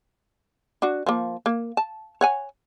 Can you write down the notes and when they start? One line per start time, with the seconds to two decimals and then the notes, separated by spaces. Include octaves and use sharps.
0.82 D4 F#4
1.06 F3 A#3
1.46 A#3
1.77 A5
2.21 C#5 F#5 G#5